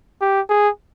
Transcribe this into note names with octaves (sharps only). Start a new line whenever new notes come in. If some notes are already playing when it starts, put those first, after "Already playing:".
G4
G#4